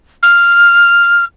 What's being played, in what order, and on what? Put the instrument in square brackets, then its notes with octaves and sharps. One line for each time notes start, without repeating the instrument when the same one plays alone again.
[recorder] F6